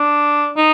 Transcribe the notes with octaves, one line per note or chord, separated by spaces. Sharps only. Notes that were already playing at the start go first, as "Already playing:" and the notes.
Already playing: D4
D#4